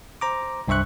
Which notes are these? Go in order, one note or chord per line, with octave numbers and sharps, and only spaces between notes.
C5 A#5 D6
C2 G2 C5 E5 C#6 F#6